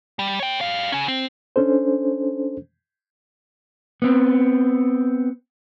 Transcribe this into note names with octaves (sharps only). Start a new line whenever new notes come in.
G3
C#5 G5
G3 F5
C#3 C#4
C4
C#4 D4 A4 C5
B3 C4